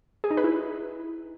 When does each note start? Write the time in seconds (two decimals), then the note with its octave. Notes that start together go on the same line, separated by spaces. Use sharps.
0.24 G#4
0.31 D#4
0.37 B4
0.44 E4